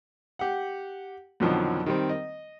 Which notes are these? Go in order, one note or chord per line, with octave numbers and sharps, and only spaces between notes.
G4 F#5
F2 B2 D3 D#3 F3 F#3
D#3 G3 C4
D#5